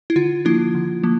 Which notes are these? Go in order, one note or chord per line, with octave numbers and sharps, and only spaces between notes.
E4
D3 F4
F3 A#3 D4 E4
D3
F3 A#3